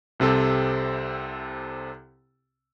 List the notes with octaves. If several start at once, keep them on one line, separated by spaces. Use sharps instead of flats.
C2 C3 C4 A4